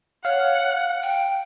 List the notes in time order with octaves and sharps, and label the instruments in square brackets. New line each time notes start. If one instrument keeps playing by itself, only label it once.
[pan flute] C#5 [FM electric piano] F5 [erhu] F#5
[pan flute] G5